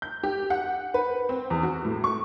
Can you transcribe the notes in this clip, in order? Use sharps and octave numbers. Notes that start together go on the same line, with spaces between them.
G6
G4
F#5
B4
C4
E2
F#4
A2
C#6